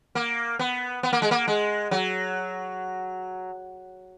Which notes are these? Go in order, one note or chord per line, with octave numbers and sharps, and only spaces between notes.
A#3
B3
B3
A#3
G#3
A#3
G#3
F#3